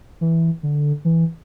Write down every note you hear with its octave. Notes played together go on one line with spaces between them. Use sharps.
E3
D3
E3